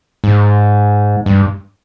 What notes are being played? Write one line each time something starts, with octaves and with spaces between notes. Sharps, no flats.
G#2
G2